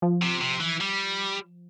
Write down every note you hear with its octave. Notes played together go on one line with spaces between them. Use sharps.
F3
C3
C3
E3
G3